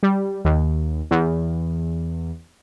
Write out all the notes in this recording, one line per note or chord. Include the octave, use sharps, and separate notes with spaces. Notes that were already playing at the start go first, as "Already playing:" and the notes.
G3
D#2
E2